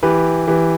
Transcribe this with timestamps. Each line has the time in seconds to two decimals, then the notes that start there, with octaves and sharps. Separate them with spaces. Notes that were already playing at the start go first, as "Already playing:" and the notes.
0.03 E3 G4 B4
0.47 E3 G4 B4